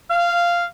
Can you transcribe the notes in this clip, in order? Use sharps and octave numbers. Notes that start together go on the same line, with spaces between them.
F5